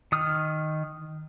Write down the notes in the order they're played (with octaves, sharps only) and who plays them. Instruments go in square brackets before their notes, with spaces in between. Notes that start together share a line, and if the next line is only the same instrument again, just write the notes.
[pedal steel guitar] D#3 D#6 F6